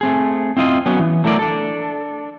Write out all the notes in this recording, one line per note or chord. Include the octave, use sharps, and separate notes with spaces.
A3 C4 G#4
C4 E4 F4 D#5
F#3 B3 C#4
E3
F#3 A3 E4 A#4 D5
D4 A4